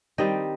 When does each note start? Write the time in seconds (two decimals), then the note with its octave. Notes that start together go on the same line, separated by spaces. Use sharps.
0.18 D#3 G3 C4 D#4 D#5